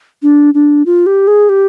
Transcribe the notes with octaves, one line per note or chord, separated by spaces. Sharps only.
D4
D4
F4
G4
G#4
G4